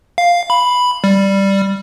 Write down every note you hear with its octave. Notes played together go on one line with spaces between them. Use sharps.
F5
B5
G3